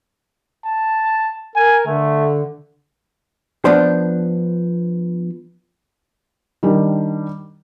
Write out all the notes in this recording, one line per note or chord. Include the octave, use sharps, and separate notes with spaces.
A5
A#4 G#5
D3 A3
F3 B3 D4 C5
D#3 G3 D4